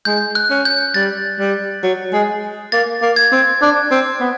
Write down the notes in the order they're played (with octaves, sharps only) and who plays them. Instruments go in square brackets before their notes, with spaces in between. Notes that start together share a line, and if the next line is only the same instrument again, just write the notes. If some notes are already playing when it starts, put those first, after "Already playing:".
[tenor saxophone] G#3 [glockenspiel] G6
[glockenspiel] F#6
[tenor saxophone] C#4
[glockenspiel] G6
[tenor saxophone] G3 [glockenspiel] A6
[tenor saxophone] G3
F#3
G#3
[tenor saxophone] A#3 [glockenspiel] A6
[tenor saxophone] A#3
[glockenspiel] G#6
[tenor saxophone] C4
D4
C4
B3